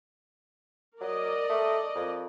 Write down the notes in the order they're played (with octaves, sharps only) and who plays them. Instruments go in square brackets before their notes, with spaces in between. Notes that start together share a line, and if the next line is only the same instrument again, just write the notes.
[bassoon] F#3 [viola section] A#4 D5 D#5
[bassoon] A3
F2